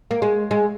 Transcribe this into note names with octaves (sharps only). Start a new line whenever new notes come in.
A#3
G#3
G#3